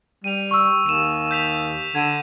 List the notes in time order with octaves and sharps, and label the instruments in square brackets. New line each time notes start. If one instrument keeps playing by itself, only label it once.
[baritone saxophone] G3 [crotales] D#7 F7
[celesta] C#6 E6
[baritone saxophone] D#2 [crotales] D#7 E7
[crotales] G6 B6 F7
[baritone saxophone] D3 [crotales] G#6 D#7 E7